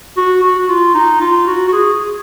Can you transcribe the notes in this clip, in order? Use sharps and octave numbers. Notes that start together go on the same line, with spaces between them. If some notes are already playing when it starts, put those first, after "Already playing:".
F#4
F#4
F#4
F4
D#4
F4
F#4
F#4
G#4
G#4